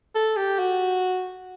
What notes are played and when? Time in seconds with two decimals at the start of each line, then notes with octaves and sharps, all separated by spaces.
0.15 A4
0.37 G4
0.59 F#4